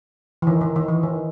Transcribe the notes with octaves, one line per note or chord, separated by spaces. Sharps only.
E3
D#3
D#3
D#3
E3
D#3